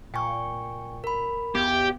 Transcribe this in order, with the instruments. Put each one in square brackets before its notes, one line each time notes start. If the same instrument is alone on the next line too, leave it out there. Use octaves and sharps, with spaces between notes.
[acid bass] A#2 [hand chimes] G5 G#5 C#6
[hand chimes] A#4 B5
[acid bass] E2 [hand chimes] B3 [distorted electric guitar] G4